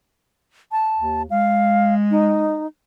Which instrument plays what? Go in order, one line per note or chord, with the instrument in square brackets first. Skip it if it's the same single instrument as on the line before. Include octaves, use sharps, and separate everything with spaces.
[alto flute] A5
[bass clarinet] D#2
[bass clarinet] G#3 [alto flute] F5
[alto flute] D#4